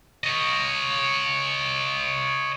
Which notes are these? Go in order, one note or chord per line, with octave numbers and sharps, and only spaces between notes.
C#5 D#5